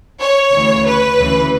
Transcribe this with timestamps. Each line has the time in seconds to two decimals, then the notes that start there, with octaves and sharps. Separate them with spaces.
0.21 C#5
0.53 D2 C#3 E3
0.86 B4
1.18 D2 C#3 E3